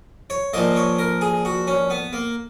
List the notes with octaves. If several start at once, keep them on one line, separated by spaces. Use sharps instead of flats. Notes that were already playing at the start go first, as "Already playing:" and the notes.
C#5
A#2 F3 A#3 D#5
C#5
A#4
G#4
F#4
C#4
B3
A#3